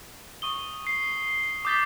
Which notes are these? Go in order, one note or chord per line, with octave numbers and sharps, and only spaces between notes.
C#6 D#6 G7
C7
D6 D#6 G6 A6 B6 G7